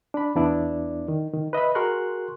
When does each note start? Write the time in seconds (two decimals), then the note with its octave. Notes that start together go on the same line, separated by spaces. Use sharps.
0.14 D4 B5
0.35 E2 B3 D4 E4 D5
1.08 D#3
1.33 D#3
1.53 B4 D#5 E5 B5
1.75 F#4 G#4 A#4 C6 C#6 F#6